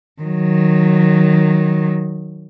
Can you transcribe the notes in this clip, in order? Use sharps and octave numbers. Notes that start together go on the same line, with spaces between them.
D#3 F#3